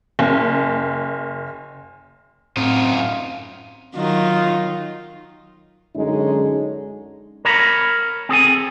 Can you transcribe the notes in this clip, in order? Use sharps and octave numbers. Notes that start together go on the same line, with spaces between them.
F#1
F#2 A2 C4 D#4 F4
F5
D#3 F#3 D#4 F4
F#2 D3 G#3 C#4 D#4
A#4 C#5 A#5 B5
C4 G#4 A4 G#5